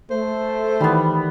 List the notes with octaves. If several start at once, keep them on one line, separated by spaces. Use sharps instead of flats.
A3 C5
D#3 E3 G3 B3